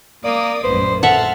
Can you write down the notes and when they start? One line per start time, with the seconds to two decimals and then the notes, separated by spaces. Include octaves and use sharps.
0.24 A#3 D5 D#6
0.64 A#1 F#2 A2 B4 C5
1.03 A3 E5 F#5 A5 F6